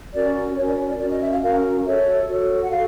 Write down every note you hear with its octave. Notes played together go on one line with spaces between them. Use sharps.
C#4 F#4 A#4 D5
C#4 F#4 A#4 C#5
D5
C#5
D5
C#4 F#4 A#4 D5
D#5
E5
F5
C#4 F#4 A#4 F5
F#4 A4 C#5 E5
F#4 A4 C#5
F#5
F#4 A4 F5